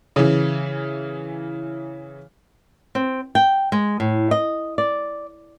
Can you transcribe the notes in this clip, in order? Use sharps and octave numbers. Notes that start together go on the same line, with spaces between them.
C#3 E3
C4
G5
G#3
A2
D#5
D5